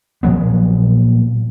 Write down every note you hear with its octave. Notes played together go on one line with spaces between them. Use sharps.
A#2 F3 F#3 B3